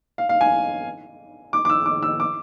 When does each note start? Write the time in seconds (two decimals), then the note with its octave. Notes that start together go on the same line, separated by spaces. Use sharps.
0.18 F5
0.29 F5
0.41 G#5
1.53 D6
1.65 D6
1.70 E6
1.86 D6
2.03 E6
2.20 D6